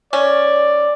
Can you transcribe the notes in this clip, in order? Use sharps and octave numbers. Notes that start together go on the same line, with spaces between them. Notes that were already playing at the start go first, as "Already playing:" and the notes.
C#4 D5